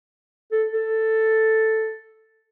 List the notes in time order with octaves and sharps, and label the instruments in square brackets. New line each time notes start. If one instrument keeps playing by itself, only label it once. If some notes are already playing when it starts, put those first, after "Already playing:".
[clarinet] A4
A4